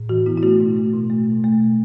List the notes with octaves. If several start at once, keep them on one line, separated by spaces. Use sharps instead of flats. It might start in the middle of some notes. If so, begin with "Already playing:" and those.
Already playing: A2
E3 F#4
B3 E4
E4
A3 F#4
B2
A3
B2
A3
B2
A3
B2